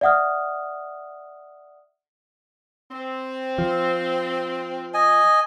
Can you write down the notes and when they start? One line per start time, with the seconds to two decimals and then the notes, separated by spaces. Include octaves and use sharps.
0.01 D5 E5 F#5 D#6 F6
2.91 C4
3.58 F3
4.94 D#5 G#5